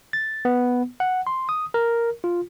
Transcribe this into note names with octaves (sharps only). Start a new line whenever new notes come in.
A6
B3
F#5
C6
D#6
A#4
F4